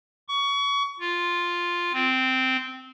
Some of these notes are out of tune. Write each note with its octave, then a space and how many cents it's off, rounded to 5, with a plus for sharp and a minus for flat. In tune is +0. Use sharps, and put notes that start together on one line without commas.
C#6 +25
F4 +0
C4 -10